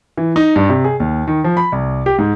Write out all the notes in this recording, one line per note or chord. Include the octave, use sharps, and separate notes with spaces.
E3
D#4
G2
C3
G#4
D#2
D#3
F3
B5
C2
G4
G#2